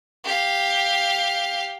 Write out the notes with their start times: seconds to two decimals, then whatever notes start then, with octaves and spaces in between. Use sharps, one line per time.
0.24 G4 F5